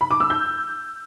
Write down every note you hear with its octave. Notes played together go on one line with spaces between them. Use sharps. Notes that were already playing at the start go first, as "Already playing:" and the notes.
B5
D6
E6
G6